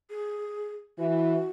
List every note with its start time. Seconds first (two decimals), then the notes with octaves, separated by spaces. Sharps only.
0.10 G#4
0.98 E3 F#4